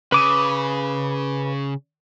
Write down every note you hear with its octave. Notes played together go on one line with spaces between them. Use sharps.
C#3 B4 D6 D#6